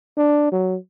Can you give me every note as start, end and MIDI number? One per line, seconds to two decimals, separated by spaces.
0.17 0.51 62
0.52 0.76 54